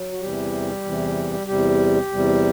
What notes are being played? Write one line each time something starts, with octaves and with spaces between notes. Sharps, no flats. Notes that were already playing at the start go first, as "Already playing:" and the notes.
Already playing: F#3
F#4
E2 C3 E3 G3 G4
E2 C3 E3
E2 C3 G3 G4
E2 C3 G3